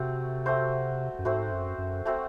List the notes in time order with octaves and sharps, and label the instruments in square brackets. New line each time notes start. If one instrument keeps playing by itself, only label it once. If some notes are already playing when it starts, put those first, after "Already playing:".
Already playing: [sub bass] C3 [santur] A3 C4 F#4
[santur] A3 C4 F#4 C5
[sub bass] F#2
[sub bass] G#2 [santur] A3 C4 F#4 C5
[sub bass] F#2
F#2
[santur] A3 C4 F#4 C5